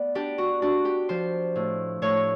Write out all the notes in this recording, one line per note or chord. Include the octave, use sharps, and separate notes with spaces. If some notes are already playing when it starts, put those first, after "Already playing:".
Already playing: B3 D5
D4 G4
F#4
D4 F#4
G4
F3 C5
A2
A2 C#5